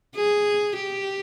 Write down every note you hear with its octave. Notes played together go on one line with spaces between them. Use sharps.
G#4
G4